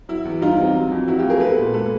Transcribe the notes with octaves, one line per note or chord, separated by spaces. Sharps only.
F#3 E4
E2
G3 D#4 F4
C4
F#3
F2
F#3 E4 F#4
F4 G4
A3
G#4 A#4
B3 A4 B4
A#2
G#3 A4 B4